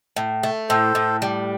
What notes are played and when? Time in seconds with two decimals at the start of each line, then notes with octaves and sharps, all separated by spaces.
0.17 A2
0.43 A3
0.69 A2 A4 C5
0.95 A2
1.22 G3